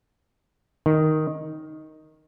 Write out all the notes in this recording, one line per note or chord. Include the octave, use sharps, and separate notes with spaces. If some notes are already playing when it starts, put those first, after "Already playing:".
D#3